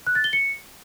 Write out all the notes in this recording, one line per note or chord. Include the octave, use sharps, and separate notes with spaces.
F#6
A6
G7
C#7